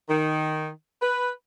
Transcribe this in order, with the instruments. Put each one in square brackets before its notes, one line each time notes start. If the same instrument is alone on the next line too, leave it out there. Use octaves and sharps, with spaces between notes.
[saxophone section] D#3
B4